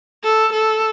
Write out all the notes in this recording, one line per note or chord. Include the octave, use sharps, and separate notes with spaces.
A4
A4